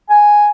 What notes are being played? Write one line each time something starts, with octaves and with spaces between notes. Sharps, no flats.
G#5